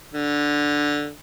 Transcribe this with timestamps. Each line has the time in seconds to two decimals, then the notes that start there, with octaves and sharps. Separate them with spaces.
0.13 D3